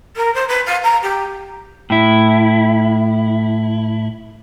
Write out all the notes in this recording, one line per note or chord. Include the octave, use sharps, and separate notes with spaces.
A#4
C5
B4
F5
A#5
G4
A2 E4